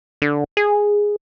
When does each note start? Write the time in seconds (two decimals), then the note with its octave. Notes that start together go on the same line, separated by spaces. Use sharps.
0.22 D3
0.57 G#4